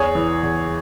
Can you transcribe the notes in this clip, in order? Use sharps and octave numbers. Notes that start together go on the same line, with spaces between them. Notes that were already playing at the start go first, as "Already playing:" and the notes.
Already playing: E2 G#4 C#5
E3
E2